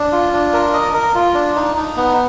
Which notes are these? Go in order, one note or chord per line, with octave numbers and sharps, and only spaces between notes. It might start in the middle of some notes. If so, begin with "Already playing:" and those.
Already playing: D4
F4
D4
A#4
D#5
A#4
F4
D4
D#4
D#4
B3